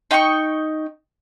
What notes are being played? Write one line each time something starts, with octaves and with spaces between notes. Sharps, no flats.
D#4 G5 C6 C#6